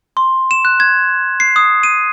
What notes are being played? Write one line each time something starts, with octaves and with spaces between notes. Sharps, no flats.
C6
E7
F#6
G#6
C7
D#6
D#7